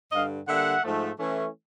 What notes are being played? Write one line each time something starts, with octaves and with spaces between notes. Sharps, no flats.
G2 D3 G3 D#5 F5
D3 G3 A#3 E5 F#5
G#2 F3 A3
E3 A3 C#4